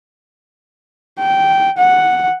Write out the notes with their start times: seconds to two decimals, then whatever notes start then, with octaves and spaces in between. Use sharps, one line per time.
1.20 G5
1.78 F#5